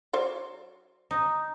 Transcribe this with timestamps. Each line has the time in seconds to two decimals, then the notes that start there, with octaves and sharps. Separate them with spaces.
0.13 F#3 C5 D5
1.11 D#4